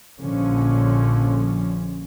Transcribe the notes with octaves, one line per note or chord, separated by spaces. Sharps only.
A#1 D3 F3 C#4